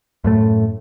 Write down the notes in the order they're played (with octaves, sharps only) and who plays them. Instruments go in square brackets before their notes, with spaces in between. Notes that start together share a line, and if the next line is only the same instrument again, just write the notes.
[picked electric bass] F#2 A2 A3